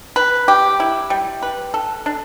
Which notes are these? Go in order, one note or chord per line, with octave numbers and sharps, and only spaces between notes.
B4
G4
E4
G3
B4
A4
D4